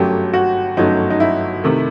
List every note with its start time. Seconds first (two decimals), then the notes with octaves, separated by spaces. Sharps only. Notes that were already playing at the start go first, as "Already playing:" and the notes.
Already playing: G1 F#2 F#3 A3 G4
0.34 F#4
0.77 G1 F#2 F#3 A3 D#4
1.10 D#4
1.20 E4
1.64 C3 D#3 A3